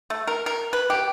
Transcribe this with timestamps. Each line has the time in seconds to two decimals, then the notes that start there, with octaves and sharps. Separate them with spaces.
0.10 A3
0.27 A#4
0.46 A#4
0.73 B4
0.90 G4